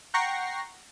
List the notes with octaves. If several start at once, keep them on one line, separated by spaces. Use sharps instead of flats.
F#5 G5 A#5 C#6 A#6 C7